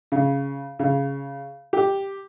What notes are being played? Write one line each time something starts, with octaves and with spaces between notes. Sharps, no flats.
C#3
C#3
G4